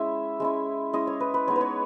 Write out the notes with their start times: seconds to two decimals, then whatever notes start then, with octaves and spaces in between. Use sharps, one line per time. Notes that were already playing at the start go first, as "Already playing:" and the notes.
Already playing: G#3 C#4 E4 E5
0.40 G#3 C#4 E4
0.93 G#3 C#4 E4 D#5
1.07 C#5
1.20 B4
1.34 B4
1.47 G#3 B3 D#4 C#5
1.56 B4
1.61 C#5